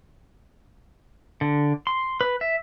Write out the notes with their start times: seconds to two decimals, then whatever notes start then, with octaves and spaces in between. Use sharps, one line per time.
1.41 D3
1.87 C6
2.21 B4
2.41 E5